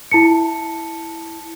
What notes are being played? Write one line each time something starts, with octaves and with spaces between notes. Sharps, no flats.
E4 A5 C#7